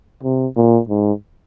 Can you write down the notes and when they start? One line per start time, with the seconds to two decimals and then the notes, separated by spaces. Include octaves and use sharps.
0.23 C3
0.56 A#2
0.89 G#2